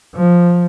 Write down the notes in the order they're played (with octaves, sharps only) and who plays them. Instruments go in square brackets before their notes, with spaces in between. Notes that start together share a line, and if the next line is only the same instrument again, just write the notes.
[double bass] F3